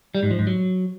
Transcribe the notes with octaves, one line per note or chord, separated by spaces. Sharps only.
G3
G#2
F3
G#2
F#3